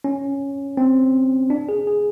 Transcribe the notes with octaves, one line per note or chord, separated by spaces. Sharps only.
C#4
C4
D4
G#4
G#4